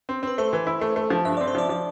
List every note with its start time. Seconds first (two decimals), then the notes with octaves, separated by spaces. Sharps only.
0.09 C4
0.23 C4 B4
0.38 A3 C5
0.53 E3
0.67 E4
0.81 A3
0.96 A3
1.10 F3
1.25 G2 E5
1.37 D5
1.41 C4
1.48 C5
1.55 F3 D5
1.69 F3 D5